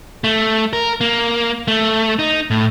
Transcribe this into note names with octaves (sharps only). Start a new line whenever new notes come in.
A3
A#4
A#3
A3
D#4
A2